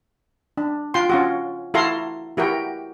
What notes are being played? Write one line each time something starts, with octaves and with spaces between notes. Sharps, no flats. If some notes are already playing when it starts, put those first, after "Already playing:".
D4
F4 G5 C6
C#4 F4 F#4
E4 F#4 A4 F5 A#5 C6
E4 F#4 G4 A#4 G5